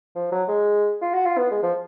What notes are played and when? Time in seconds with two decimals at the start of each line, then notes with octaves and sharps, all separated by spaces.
0.15 F3
0.31 F#3
0.48 G#3
1.02 F4
1.14 F#4
1.26 F4
1.37 B3
1.51 G#3
1.62 F3